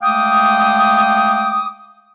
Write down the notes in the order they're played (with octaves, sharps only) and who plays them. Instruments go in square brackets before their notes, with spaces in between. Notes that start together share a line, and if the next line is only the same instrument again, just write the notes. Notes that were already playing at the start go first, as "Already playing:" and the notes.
[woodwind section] G#3 A3 F5 G5 D6 D#6